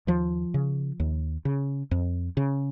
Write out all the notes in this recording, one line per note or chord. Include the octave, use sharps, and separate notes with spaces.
D#2 F3
C#3
D#2
C#3
F2
C#3